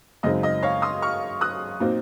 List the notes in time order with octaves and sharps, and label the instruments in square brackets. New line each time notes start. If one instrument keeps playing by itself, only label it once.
[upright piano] F#2 C#3 G#3 C4 D#4 D#5
D#5
C#5 F5
C6 D#6
C#6 F6
D#6 F#6
A#2 F#3 C4 D#4